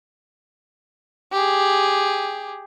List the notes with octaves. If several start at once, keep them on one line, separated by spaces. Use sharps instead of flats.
G4 G#4